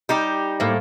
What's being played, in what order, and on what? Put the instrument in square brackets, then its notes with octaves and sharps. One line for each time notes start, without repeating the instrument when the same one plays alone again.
[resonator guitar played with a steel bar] G3 D#4 G4
[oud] A2 A#3 E5